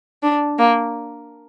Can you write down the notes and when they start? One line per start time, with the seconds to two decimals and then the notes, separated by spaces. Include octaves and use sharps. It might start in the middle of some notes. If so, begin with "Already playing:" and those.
0.23 D4
0.58 A#3